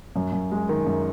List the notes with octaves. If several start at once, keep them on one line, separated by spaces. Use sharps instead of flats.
F#2
F#2
G#3
D#3
F#2